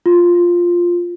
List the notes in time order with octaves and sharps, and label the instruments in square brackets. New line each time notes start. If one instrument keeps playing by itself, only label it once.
[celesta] F4